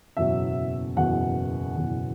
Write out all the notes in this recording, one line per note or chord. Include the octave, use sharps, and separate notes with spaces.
F#1 E2 B2 F#3 E5
F#1 E2 B2 F#3 F#5
F#1 E2 B2 F#3